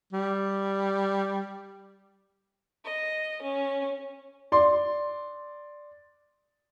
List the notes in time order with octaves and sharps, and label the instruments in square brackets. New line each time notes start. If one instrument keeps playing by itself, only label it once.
[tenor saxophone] G3
[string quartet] D#5
C#4
[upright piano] D5 C6